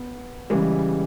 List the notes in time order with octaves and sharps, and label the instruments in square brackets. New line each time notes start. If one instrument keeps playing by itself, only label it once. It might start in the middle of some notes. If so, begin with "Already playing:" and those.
Already playing: [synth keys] B3
[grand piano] C#3 E3 G3 [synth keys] G#3